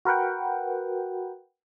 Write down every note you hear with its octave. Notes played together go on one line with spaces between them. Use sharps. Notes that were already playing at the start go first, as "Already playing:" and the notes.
F#4 A#4 B4 F#5 G5